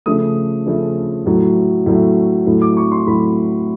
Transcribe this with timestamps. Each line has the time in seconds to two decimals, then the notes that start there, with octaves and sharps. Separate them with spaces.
0.06 C#3 F3 A3 D#6
0.66 C#3 F3 A3
1.26 A2 F#3 A3
1.86 A2 F#3 A3
2.47 A2 F#3 A3
2.62 D6
2.77 C#6
2.92 C6
3.07 A2 F#3 A3 B5